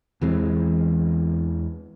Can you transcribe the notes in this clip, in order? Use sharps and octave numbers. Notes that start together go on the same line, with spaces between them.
E2 E3 G#3 C4